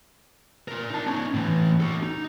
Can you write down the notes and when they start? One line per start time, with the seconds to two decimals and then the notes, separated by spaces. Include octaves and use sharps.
0.68 F4 A#4
0.90 D#4 A5
1.07 C#4 D#4
1.34 A2 E3
1.80 F#4 A4
2.03 D#4